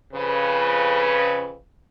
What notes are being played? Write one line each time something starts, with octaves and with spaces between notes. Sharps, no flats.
F2 C#3 B4